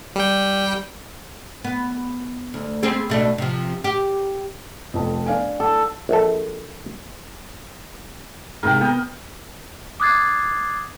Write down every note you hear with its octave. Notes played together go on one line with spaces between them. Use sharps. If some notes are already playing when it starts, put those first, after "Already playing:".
G3 G5
B3
D2
B3 C4 G#4
B2 A3 D4
C3 F3
G4
F1 F2
D4 F5 G#5
A4
A#1 A4
G#2 C3 A#4 G5
B3 A#4 G5
D6 D#6 F#6 G#6 A6 C7